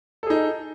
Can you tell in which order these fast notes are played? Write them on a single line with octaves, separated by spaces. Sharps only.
A4 G#4 D#4